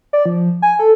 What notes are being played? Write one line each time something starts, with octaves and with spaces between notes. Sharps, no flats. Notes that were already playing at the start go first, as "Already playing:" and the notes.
D5
F3
G#5
A4